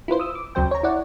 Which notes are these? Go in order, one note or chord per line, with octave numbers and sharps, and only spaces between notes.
E4 F4 B4 C5
D#6 E6
D6
D2 C#3 F#3 C5 G5
C#5 A#5
E4 C#5 D5 F#5